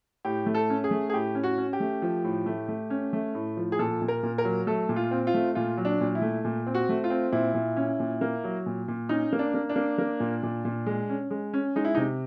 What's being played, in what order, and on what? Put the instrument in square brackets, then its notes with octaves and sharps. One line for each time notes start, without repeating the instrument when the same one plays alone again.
[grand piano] A2 G4
A3
A4
C#4
G#4
A3
G#4
A2 G4
C#4
F#4
C#4
G4
A3
F3
A2
A3
A3
C#4
A3
A2
F3
G#4
A#2 A4
A#2
A#4
A#2
A#4
F#3
A3 A4
A#2
F4
C4
F4
A3
A#2 F4
F#3
D4
A#2
E4
A3
A#2
C4
F#4
A3
F4
C4
A#2 E4
A#2
C#4
A#2
A#3
F#3
A#2
A#2
C#4 D#4
A#3
D4
A#3
D4
A#3
A#3
A#2
A#2
A#2
G#3
C#4
G#3
C#4
G#3 D#4
E4
C3 D#4